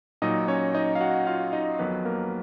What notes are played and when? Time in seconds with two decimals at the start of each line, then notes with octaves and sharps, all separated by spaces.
0.22 A#2 F#3 D#4 D#5
0.48 C#4 C#5
0.74 D#4 D#5
0.95 F5
1.00 F#4 F#5
1.27 F4 F5
1.53 D#4 D#5
1.79 F2 D#3 F#3 B3 B4
2.05 A#3 A#4